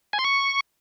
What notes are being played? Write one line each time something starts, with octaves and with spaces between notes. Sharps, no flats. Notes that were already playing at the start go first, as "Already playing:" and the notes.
G#5
C6
C#6